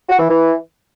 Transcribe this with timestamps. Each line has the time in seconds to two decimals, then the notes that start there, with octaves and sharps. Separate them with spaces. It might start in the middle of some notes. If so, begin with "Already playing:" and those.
0.09 F#4
0.19 E3
0.30 E3